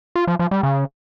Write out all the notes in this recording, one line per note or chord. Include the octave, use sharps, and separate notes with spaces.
F4
F3
F3
G3
C#3